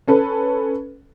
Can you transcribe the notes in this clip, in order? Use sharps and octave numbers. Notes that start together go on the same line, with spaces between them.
C#4 A4 B4